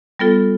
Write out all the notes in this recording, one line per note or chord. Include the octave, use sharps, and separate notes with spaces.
G3 B3 F4 A4